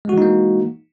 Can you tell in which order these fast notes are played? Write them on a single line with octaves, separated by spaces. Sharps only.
G#3 F#4 E3 D#4 A#3